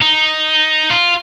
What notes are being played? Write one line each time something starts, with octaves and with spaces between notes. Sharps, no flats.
D#4
F4